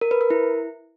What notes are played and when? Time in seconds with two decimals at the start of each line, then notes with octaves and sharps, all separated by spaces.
0.01 A#4
0.11 B4
0.21 A#4
0.30 E4